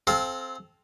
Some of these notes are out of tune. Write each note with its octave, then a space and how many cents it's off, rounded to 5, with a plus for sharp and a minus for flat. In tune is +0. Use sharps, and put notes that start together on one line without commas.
C4 +0 A4 -35 F5 +0